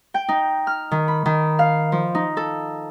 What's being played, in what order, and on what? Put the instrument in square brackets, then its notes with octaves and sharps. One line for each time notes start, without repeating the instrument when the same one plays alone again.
[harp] G5
D#4
F6
D#3
B5
D#3
F5
F3
D#4
A4